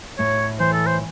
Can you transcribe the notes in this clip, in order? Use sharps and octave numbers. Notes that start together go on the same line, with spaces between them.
A2 C#5
E3 C5
A4
C5